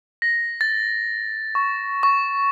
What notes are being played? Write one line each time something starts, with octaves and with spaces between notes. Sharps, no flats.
A#6
A6
C#6
C#6